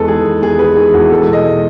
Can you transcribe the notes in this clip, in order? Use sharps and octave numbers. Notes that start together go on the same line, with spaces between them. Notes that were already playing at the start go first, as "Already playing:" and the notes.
Already playing: E2 G#3 A4 B4
D#3 G#4
E2
E2 G#4
G#3 B4
D#3 G#4
E2 F#4
G#3 A4
B2
D#5
G#3